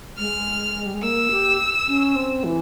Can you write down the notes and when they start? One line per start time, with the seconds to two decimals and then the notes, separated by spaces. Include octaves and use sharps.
0.18 G#3 F6
0.86 G3
0.94 G#3
1.03 A#3 E6
1.31 G4
1.88 C#4
2.16 C4
2.44 E3